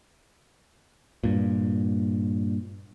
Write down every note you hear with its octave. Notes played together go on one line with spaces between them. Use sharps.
G2 A#2